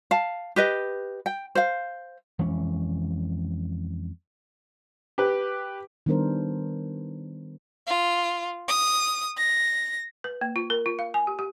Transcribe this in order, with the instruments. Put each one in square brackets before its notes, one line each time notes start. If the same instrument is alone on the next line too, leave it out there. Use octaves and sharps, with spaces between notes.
[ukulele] F5 A5
G4 B4 D#5
G5
C5 F5
[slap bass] F2 E3 G#3 C#4
[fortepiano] G4 B4
[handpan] D#3 G3 B3 D4 A#4 C5
[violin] F4
D#6
A#6
[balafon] B4
A#3
F4
A#4
F4
F5
G#5
G4
G4